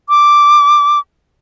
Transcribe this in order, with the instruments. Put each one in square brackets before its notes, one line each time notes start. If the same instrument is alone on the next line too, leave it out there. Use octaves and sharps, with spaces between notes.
[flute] D6